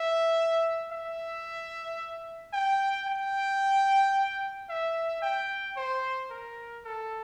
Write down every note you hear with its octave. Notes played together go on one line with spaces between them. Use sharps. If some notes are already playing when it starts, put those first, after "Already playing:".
Already playing: E5
E5
G5
G5
E5
G5
C5
A#4
A4